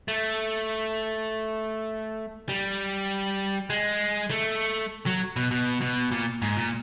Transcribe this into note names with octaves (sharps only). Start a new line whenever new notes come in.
A3
G3
G#3
A3
F#3
B2
B2
B2
A#2
G#2
A#2